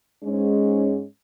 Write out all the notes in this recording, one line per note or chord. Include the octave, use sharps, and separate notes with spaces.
G#2 G#3 C#4